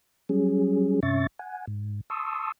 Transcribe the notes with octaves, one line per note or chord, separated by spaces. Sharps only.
F#3 G3 C#4 G#4
G2 C3 C#4 E5 C#6 A6
F#5 G#5
G#2
A5 C6 C#6 D#6 E6